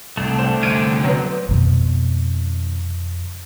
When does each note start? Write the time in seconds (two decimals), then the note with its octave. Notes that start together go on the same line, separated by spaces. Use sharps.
0.17 C2 A3 D4
0.39 A2 C5 E7
0.63 C2 D3 G#6 D7 D#7
1.04 F#3 B3
1.49 F2 B2 D#3